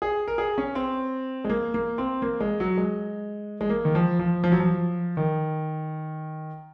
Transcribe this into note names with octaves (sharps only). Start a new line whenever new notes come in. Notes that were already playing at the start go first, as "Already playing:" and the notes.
G#4
A#4
G#4
C#4
C4
G#3
A#3
A#3
C4
A#3
G#3
F#3
G#3
G#3
A#3
D#3
F3
F3
F3
F#3
F3
D#3